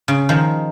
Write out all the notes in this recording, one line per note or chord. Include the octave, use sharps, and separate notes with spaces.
C#3
D#3 F3